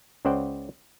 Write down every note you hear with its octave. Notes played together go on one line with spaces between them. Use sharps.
C#2 C#3 C5 D5 F#5 G5